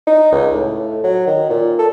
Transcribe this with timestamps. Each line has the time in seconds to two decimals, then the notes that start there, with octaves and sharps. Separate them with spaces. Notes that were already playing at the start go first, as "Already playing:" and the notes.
0.07 D#4
0.32 C#2
0.53 A2
1.04 F#3
1.27 D#3
1.50 A#2
1.79 A4